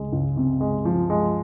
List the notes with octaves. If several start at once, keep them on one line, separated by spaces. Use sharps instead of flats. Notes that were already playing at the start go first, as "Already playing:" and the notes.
Already playing: C#2 G#3
C#2
C3
G#3
F3
G#3